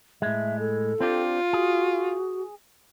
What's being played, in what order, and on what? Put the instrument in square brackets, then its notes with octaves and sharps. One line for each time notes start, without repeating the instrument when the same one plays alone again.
[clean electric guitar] A2 G#3 [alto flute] E5
[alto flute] A4
[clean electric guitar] C4 D4 G4 [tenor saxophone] F4
[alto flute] F#4 [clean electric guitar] G#4